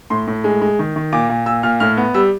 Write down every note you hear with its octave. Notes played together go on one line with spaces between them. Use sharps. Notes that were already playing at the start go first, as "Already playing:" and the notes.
A2 C6
A2
G#3
G#3
D#3
D#3
A#2 D6
A#2
A#2 E6
A#2 F6
A2 F6
B3
G3 E6